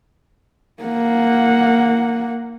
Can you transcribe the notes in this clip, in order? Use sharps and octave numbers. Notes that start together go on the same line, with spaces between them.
A#3 F#5